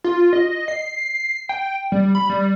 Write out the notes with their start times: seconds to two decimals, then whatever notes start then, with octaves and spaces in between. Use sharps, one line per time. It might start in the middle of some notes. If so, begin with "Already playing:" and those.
0.04 F4
0.33 D#5
0.68 C7
1.49 G5
1.92 G3
2.15 B5
2.29 G3